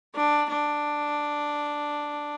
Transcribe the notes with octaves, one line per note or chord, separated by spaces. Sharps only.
D4
D4